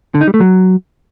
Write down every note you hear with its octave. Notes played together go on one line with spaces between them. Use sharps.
D3
D#4
G3
A3
F#3